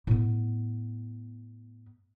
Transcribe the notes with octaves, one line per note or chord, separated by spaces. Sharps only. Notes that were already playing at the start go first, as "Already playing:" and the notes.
A2 B3